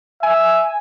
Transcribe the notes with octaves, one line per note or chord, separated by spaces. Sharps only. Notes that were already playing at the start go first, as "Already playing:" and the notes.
E5 G#5